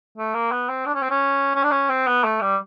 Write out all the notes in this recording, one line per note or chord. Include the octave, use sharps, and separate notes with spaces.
A3
A#3
B3
C4
D4
C#4
C4
C#4
C#4
D4
C#4
C4
B3
A3
G3